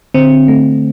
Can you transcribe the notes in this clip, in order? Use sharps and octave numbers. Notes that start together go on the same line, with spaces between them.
D3 C4
A3